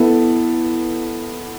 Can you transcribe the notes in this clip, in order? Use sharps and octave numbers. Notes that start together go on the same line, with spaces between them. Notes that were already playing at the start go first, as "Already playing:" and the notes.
Already playing: B3 E4 A4